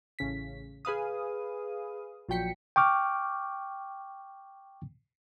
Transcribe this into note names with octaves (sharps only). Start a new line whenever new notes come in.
A1 C#3 B6
G#4 B4 F5 D#6
A#1 F3 F#3 G5 B6 C#7
G5 C#6 D6 F6